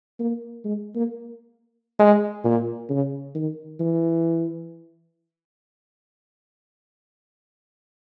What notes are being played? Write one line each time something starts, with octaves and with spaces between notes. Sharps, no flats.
A#3
G#3
A#3
G#3
A#2
C#3
D#3
E3